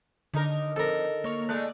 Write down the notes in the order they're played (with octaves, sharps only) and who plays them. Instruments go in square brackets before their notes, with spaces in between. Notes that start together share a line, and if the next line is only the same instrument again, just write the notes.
[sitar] D#2 D#4 A#4 [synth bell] D3
[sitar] F2 [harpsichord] A4 A#4
[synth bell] A#3 C#6 F7 [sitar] C#5
[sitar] G#3 A3 [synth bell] D5 F#6